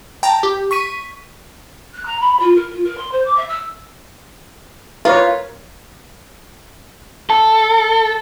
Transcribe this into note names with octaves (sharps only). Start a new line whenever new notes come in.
G5 A5 A#5
G4
C#6 B6 D#7
F#6
A#5
B5
F4
A#4
F4
A#4
C6
C5
D6
E5
E6
F4 A#4 B4 C#5
A4